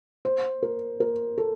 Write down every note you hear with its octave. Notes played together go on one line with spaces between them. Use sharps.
C5
A#4
A#4
A4